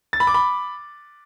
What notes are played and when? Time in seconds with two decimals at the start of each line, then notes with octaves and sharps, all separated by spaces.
0.13 A6
0.20 B5
0.27 D6
0.34 B5